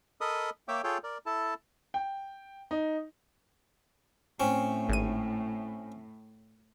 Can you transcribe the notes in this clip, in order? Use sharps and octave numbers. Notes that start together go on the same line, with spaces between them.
A4 A#4 D#5 B5 D#6
A#3 C#5 E5 G5 D6
F4 G#4 A4 C#5 G5
A#4 D5
E4 A4 A5
G5
D#4
A2 C4 C#4
G#1 D#7